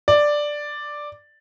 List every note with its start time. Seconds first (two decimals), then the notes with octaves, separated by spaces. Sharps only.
0.08 D5